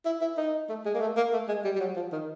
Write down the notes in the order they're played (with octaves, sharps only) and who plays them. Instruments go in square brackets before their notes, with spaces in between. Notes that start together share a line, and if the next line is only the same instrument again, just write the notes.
[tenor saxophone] E4
E4
D#4
A3
G#3
A#3
A3
A#3
A3
G#3
G3
G3
F#3
F3
D#3